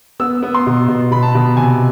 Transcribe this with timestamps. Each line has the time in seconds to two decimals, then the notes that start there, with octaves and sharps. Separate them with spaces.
0.20 B3 E6
0.43 B3
0.55 C6
0.67 B2
0.88 B2
1.11 B2 B5
1.22 A5
1.35 B2
1.57 C3 G#5